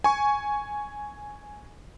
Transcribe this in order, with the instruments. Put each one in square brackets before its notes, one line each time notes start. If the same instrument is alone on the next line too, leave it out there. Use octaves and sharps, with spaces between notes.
[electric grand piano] G#5 C#6